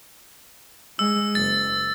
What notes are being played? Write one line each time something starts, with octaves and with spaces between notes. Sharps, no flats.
G#3 E6
F#1 A6